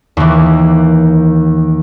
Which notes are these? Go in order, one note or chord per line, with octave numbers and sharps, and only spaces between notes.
D#2 E3